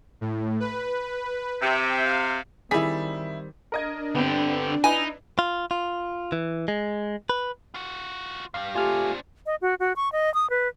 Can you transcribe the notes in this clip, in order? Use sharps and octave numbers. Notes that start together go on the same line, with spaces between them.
A2
B4
C3 E5 G5
F5
D#3 G3 C4 E4 G#4 B6
D4 A#4 D#5 G#6
D3 B3 C4 G4
D#4 E4 B4 D#5 G#5
F4
F4
E3
G#3
B4
F4 F#4
G2 G3 F5
A3 C4 D4 F4 G4 G#5 F6
D#5
F#4
F#4
C#6
D#5
D#6
B4